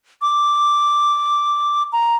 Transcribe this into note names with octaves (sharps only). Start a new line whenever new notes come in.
D6
A#5